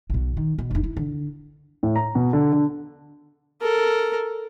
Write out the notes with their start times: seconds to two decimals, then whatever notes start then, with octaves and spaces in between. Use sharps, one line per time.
0.10 B1 B2
0.37 D#3
0.59 B2
0.71 F1 D#4
0.84 E4
0.97 D3
1.83 A2
1.96 A#5
2.15 B2
2.33 D3
2.52 D3
3.61 A4 A#4